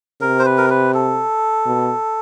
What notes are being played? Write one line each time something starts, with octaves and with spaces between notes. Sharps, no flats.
C3 A#4
C5
B4
A#4
B4
A4
B2